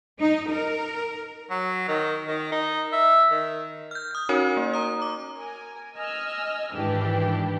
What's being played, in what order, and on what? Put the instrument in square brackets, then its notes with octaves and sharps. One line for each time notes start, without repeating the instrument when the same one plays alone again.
[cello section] D#4
A#4
[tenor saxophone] F#3
D#3
D#3
D#4
E5
D#3
[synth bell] F6 G6
D#6 G6
C#4 D#4 F#4 A#4 C#5
A#3
A#5 D#6
D6
[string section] A#4 G#5
D#5 G#5 E6 F6
G#2 D#3 E3 G3 D4 G4